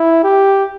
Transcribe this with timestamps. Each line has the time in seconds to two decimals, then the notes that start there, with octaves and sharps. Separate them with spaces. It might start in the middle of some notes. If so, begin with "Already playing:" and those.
Already playing: E4
0.24 G4